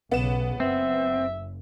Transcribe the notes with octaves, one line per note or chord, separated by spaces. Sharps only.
B1 C#3 B3 E7
F#1 C4 E5